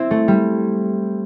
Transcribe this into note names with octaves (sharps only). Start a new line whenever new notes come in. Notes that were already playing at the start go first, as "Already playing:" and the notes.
Already playing: C4 E4
A3
G3